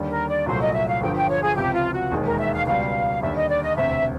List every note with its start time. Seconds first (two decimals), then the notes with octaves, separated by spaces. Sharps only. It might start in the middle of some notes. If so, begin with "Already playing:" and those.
Already playing: D#2 D3 G3
0.10 A#4
0.28 D5
0.46 C2 A#2 F#3 A3 C5
0.60 D#5
0.74 E5
0.87 F5
1.01 G1 G2 D3 F3 G5
1.16 G5
1.29 C#5
1.42 G#4
1.56 C#2 C3 F3 G4
1.74 F4
1.93 F#4
2.11 E1 D#2 D#3 G#3
2.26 A#4
2.39 E5
2.53 F5
2.66 C#2 B2 G3 F5
3.21 D#2 D3 G3 E5
3.35 D#5
3.49 D5
3.63 D#5
3.76 E1 D2 C3 E5